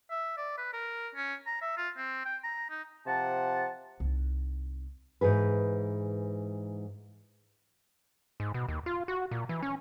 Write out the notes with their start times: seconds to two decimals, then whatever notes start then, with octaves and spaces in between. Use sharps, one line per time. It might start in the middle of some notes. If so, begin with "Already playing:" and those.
0.10 E5
0.37 D5
0.58 B4
0.73 A#4
1.15 C#4
1.47 A#5
1.62 E5
1.77 F4
1.97 C4
2.25 G5
2.44 A#5
2.70 D#4
3.06 C3 F3 F#5 A5
4.00 C2 D#4
5.21 G#2 E3 G#4 B4
8.40 G#2
8.54 B2
8.69 D#2
8.86 F4
9.08 F#4
9.31 A#2
9.49 E3
9.62 C#4